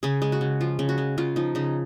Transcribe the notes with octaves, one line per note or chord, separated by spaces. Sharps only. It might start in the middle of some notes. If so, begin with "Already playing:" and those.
C#3 G#4
G#3
F#4
C#3
F3 F4
C#3
F#4
G#3
C#3 F4
F3 D#4
C#3 D#4